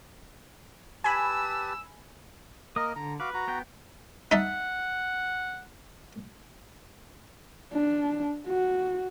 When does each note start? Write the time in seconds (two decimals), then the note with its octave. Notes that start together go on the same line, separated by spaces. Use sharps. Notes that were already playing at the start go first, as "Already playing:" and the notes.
1.04 G4 B4 G#5 A5 B5 E6
2.76 A#3 A#4 D#5 D#6
2.96 D3 A#5
3.20 F#4 B4 F5 D6
3.34 F#4 A#5
3.48 B3 G5
4.31 D#4 E5 F#5 A5
7.73 D4
8.48 F#4